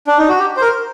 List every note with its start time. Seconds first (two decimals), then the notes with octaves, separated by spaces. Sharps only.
0.07 D4
0.18 D#4
0.28 F#4
0.39 G4
0.57 C5
0.62 A#4